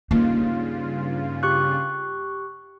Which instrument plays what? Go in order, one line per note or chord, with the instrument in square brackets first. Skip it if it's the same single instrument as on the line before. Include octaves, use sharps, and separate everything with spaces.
[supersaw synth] G2 C#3 F4 [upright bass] A#3 D#4
[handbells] G4 C#6 F#6